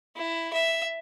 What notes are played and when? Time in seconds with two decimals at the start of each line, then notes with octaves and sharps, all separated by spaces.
0.16 E4
0.53 E5